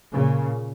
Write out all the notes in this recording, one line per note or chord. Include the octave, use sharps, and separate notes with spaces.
A#2 C#3